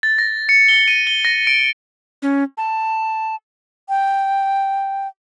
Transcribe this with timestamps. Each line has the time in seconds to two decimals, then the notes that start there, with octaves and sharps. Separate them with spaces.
0.03 A6
0.18 A#6
0.49 C#7
0.68 G7
0.88 D#7
1.07 G7
1.25 A#6
1.47 D7
2.22 C#4
2.58 A5
3.89 G5